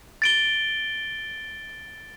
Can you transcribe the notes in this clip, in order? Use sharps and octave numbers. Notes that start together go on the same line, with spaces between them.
A6 D7 G7